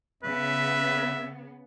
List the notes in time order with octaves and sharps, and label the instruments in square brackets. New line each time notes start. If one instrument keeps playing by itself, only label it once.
[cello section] C#3 B3 [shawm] B4 [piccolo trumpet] E5